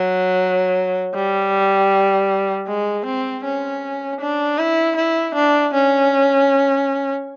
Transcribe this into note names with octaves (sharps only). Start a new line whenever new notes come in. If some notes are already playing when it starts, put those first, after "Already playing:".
Already playing: F#3
G3
G#3
C4
C#4
D4
E4
E4
D4
C#4